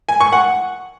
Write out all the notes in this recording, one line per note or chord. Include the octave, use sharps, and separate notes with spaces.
G#5
C#6
F#5